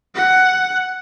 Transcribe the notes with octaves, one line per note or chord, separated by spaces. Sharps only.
F#5